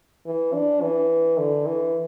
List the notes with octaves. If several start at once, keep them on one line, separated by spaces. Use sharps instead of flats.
E3
D4
E3
D3
E3